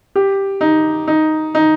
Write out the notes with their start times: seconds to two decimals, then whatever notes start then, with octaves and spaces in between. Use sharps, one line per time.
0.16 G4
0.61 D#4
1.08 D#4
1.55 D#4